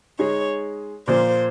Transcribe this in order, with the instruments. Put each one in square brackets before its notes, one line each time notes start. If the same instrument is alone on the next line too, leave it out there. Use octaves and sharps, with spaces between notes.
[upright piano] G#3 D#4 G#4 [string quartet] C#5
[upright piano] A#2 F3 A#3 F4 [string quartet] C5